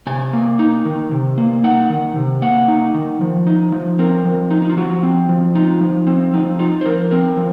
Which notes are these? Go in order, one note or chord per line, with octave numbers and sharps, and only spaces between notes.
C3 G#5
A#3
D#4
D#3
C3
A#3
D#4 F#5
D#3
C3
A#3 F#5
D#4
D#3
F3
D#4
F3
C4 A#4
F3
D#4
D#4
F4
F3 F#4
C4
F3
D#4 F4
F3
C4
F3 D#4
D#4 F4
C5
F3 A#4
C4 A#4
F3